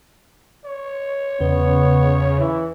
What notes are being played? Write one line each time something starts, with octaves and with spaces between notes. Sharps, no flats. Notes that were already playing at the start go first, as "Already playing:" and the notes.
C#5
E2 C#3 B3 B4
E3 E4